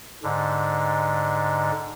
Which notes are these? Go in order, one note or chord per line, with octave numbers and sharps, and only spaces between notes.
G#2 D3